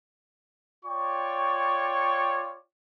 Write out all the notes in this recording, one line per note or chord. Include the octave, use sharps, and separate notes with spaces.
F4 C#5 D5 G5 C#6